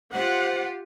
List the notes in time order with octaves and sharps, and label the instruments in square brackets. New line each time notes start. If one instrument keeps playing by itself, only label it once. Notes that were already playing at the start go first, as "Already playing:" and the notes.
[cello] F4 G4 [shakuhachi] C5 [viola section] F#5